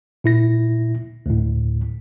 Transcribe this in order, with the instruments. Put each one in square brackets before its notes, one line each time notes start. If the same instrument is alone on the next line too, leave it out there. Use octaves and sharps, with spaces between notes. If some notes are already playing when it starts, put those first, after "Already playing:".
[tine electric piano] A#2 E4 A#6
D2 A2